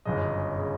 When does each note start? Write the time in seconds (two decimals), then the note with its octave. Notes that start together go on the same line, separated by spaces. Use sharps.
0.05 G1 F#2 C#3 D#5
0.58 C#3